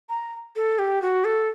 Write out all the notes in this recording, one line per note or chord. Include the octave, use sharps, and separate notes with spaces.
A#5
A4
G4
F#4
A4